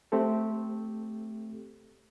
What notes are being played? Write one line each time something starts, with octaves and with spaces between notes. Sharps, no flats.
A3 C4 G4 A4